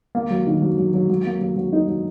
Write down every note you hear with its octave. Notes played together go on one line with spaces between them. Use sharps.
A#3
F#3
D#3
F#3
F#3
F#3
F#3
A#3
F#3
F#3
D#4
F#3